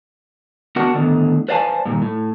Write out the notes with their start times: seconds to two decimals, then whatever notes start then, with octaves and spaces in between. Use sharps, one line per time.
0.76 B3 D4 F#4 A#4 F#5
0.94 A2 D3 D#3 B3
1.49 B4 C5 D5 F5 G#5 A5
1.85 G2 A#2 D#3
2.02 A2